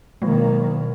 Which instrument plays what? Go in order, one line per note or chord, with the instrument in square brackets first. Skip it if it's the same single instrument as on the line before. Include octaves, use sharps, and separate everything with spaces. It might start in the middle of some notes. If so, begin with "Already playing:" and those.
[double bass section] B2 D#3 [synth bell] F#3 G#3 [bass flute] A#3